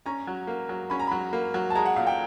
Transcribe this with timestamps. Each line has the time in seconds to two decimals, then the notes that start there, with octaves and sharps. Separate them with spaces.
0.06 C#4 A#5
0.27 F#3
0.47 A#3
0.69 F#3
0.90 C#4 B5
0.99 A#5
1.07 F#3 B5
1.33 A#3
1.54 F#3
1.70 A5
1.75 G#3 A#5
1.85 F#5
1.96 A#2 F5
2.07 G5